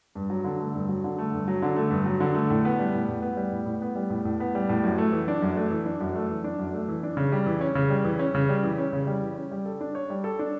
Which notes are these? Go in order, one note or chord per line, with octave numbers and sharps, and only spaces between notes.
G2
F#3
D3
A3
G2
F#3
D3
A3
G2
F#3
D3
A3
G2
F#3
D3
A3
A2
B3
G3
A2
A2
B3
G3
A2
A2
B3
G3
A2
A2
B3
G3
A2
F#2
A3
E3
D4
F#2
A3
E3
D4
F#2
A3
E3
D4
F#2
A3
E3
D4
C#3
G3
E3
C#4
C#3
G3
E3
C#4
C#3
G3
E3
C#4
C#3
G3
E3
C#4
G3
A4
D4
C#5
G3
A4
D4